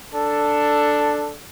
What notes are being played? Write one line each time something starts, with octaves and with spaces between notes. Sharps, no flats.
D4 A4